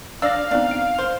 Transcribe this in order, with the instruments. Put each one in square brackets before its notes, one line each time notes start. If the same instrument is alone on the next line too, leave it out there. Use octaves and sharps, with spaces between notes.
[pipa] D4 D5 [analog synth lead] F5 [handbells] E6 F6 A#6
[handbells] B3 C4 D#4 [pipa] D4
[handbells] D7
[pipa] C5